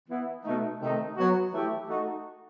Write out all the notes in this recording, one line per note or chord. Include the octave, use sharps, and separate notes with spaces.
E3 B3 E4
B2 A3 D#4
C3 D#3 A3 D#4
F#3 B3 F#4
E3 A3 E4 G4
A3 D#4 F#4